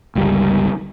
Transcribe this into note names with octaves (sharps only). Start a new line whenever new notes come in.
G1 C#2 G3